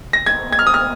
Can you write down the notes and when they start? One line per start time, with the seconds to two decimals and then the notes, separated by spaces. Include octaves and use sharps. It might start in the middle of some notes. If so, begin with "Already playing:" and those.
0.13 A#6
0.26 G#6
0.52 G#6
0.59 F6
0.67 D#6
0.74 F6